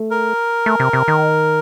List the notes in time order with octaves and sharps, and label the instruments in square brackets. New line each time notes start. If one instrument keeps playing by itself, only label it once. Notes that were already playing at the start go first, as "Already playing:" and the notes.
Already playing: [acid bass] A3
[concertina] A#4
[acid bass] A3
C3
C3
D#3